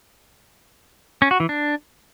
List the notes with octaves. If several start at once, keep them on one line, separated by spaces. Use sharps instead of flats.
C#4
F#4
E3
D4